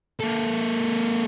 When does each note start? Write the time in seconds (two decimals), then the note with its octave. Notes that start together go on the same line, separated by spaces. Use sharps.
0.20 A#3 A4